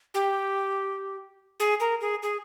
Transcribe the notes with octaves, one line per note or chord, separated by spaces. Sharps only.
G4
G#4
A#4
G#4
G#4